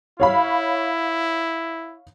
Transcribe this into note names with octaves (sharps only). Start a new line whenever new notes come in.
E4 C#5 F5 B5